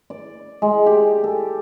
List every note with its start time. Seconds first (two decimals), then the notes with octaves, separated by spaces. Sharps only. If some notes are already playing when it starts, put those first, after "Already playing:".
0.10 D5
0.62 G#3
0.86 G4
1.24 A4